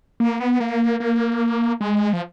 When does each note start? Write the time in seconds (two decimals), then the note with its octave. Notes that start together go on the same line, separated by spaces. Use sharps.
0.20 A#3
0.40 B3
0.60 A#3
1.00 A#3
1.81 G#3
2.13 F3